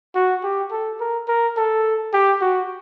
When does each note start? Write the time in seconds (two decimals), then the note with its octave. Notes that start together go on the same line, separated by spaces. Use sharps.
0.15 F#4
0.44 G4
0.72 A4
1.00 A#4
1.28 A#4
1.57 A4
2.14 G4
2.41 F#4